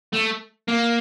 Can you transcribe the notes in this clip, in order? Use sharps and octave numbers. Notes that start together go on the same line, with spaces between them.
A3
A#3